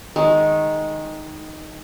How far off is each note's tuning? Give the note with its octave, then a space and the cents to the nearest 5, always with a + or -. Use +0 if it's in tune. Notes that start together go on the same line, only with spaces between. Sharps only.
D#3 +0 G#3 +0